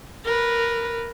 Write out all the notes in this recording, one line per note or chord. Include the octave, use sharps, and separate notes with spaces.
A#4 B4